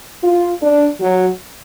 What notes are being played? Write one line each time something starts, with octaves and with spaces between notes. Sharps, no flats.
F4
D4
F#3